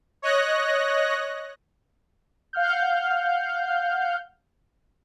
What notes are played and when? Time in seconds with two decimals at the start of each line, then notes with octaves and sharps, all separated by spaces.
0.22 C#5 D#5 F#6 A#6
2.53 F5 F#5 F6 G6